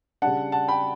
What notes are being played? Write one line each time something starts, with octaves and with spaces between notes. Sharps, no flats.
C#3 G3 D4 F#5 A5
F#5 A5
G5 B5